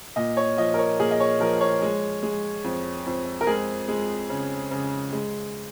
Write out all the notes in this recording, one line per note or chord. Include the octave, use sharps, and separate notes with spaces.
A#2 D#5
C#5
F3 D#5
A#4
C#5
A#2 G#4
D#5
C#5
F3 A#4
C#5
G#3
G#3
F2
F2
A#4
G#3 G#4
G#3
C#3
C#3
G#3